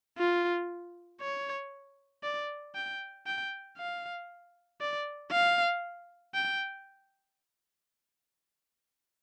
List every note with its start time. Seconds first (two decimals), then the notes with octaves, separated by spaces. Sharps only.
0.18 F4
1.21 C#5
2.23 D5
2.75 G5
3.27 G5
3.78 F5
4.81 D5
5.31 F5
6.34 G5